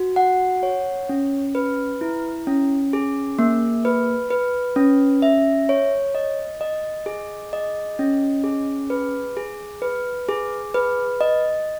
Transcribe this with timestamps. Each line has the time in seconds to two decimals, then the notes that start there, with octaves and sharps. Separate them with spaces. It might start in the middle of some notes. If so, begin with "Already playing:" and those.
Already playing: F#4
0.16 F#5
0.63 C#5
1.09 C#4
1.55 B4
2.01 E4
2.47 C#4
2.93 G#4
3.39 A#3
3.85 B4
4.30 B4
4.76 C#4
5.22 E5
5.69 C#5
6.15 D#5
6.61 D#5
7.06 G#4
7.53 D#5
7.99 C#4
8.44 G#4
8.90 B4
9.37 G#4
9.82 B4
10.29 G#4
10.74 B4
11.21 D#5